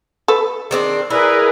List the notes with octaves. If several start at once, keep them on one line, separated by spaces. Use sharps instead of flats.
A4 B4
D#3 C4 D4 G#4
E4 G#4 A#4 B4 D5